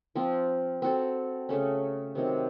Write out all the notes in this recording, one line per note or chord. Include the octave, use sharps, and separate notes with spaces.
F3 C4 F4
C4 F#4 A4
C#3 A3 C#4
C3 D#3 F#3 C4